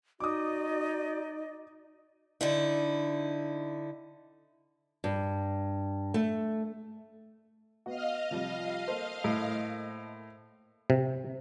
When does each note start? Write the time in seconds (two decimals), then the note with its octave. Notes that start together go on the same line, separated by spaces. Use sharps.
0.20 D#4 F#4 D5 D#5 D6 D#6
2.41 D3 D#4 E4
5.04 G2
6.14 A3
7.86 B3 F#4 D#5 F5 F6
8.31 C3 F3 G3
8.88 A#3 A4 C5
9.24 A2
10.90 C3